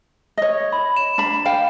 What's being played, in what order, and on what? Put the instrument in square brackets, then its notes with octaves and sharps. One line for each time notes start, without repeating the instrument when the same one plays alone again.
[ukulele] C#5 D#5
[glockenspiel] B5
E7
[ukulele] D4 B5
F5 G5